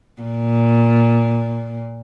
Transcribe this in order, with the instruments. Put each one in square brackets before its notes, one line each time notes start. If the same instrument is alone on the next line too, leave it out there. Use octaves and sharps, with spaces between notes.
[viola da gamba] A#2